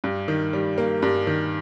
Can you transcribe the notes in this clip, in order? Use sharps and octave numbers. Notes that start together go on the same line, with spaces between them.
G2
D#3
G3
A#3
G2
D#3